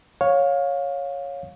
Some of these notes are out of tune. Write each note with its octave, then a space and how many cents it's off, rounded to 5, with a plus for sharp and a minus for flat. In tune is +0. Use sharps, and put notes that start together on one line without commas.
C#5 +0 F5 +20